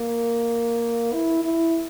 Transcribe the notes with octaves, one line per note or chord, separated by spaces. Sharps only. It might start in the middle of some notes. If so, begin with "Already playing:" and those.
Already playing: A#3
E4
E4